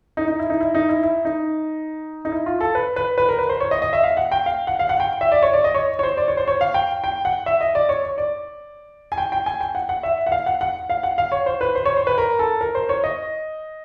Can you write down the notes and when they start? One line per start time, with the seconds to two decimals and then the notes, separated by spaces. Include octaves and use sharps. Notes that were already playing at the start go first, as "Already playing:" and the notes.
0.17 D#4
0.28 D#4
0.39 E4
0.50 D#4
0.61 E4
0.75 D#4
0.89 E4
1.03 E4
1.25 D#4
2.25 D#4
2.32 E4
2.46 F4
2.61 A4
2.75 B4
2.96 B4
3.18 B4
3.29 A#4
3.39 B4
3.49 C5
3.60 C#5
3.71 D#5
3.82 D#5
3.93 E5
4.03 F5
4.17 F#5
4.32 G5
4.46 F5
4.67 F#5
4.79 F5
4.89 F#5
5.00 G5
5.21 E5
5.32 D5
5.43 C#5
5.53 D5
5.64 D#5
5.74 C#5
5.99 C#5
6.03 C5
6.17 D5
6.28 C#5
6.37 C5
6.48 C#5
6.61 F5
6.74 G5
7.04 G5
7.25 F#5
7.46 E5
7.61 D#5
7.75 D5
7.89 C#5
8.03 C#5
8.18 D5
9.12 G#5
9.18 G5
9.32 G5
9.46 G#5
9.61 G5
9.75 F#5
9.89 F#5
10.03 E5
10.27 F#5
10.32 F5
10.46 F#5
10.61 F#5
10.90 F5
11.03 F#5
11.18 F5
11.32 C#5
11.46 C5
11.61 B4
11.75 C5
11.85 C#5
11.96 C5
12.07 B4
12.18 A#4
12.39 A4
12.61 A#4
12.75 C5
12.89 C#5
13.04 D#5